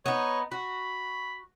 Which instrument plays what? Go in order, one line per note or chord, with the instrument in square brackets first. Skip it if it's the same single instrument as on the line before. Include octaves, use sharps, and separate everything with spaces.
[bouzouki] B3 D#4 [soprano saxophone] C#5
[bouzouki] F#4 [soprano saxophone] B5